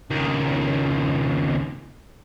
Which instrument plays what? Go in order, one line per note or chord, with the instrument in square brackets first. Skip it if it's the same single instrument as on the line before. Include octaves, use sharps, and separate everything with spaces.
[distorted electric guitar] C#2 D#3